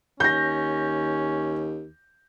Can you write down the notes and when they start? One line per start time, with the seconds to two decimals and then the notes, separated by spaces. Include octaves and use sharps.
0.20 D#2 C#4 G6 A#6